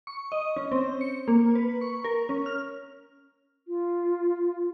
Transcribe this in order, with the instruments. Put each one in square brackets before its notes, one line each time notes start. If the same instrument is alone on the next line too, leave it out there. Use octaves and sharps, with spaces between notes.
[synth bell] C#6
D#5
C#4
C4
C#7
A#3
B4
C#6
A#4
C#4
F6
[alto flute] F4